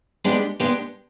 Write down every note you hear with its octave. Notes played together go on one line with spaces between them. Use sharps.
G#3 B3 D4 G4
G#3 B3 D4 G4